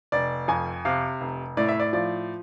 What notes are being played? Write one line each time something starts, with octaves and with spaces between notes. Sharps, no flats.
F1 D5
F2 G#5
C3 F5
F1
A2 D5
E5
D5
F3 D5